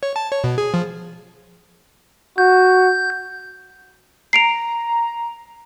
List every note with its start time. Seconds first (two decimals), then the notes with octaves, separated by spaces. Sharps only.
0.03 C#5
0.16 A5
0.32 C#5
0.44 B2
0.58 G#4
0.74 F3
2.38 F#4 G6
4.33 A#5 C7 D7 F7